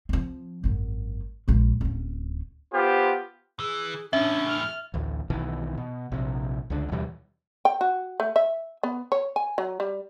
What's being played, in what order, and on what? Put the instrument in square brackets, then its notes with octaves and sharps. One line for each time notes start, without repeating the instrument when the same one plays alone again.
[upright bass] F3 C4
G#1 F#2
A#1 G#3
D1 C#4
[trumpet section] B3 F4 G4 C5
[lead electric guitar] E3 [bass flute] G#4
[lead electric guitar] E2 A2 [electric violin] C#4 [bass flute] D4 [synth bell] E5
[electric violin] F6
[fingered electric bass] A1 D2
B1 B2 D#3 E3
B2
A#1 C3
C#2 D3
D#2 B2 E3 G3
[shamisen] G5
F#4
A3
E5
B3
C#5
G#5
F#3
G3